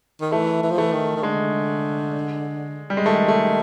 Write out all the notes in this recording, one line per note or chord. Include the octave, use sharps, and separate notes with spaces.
D#3
E3 A3
E3
F3
E3 A3
D#3
D#3
D3 G#3
G3
G#3
D#3 A3
A3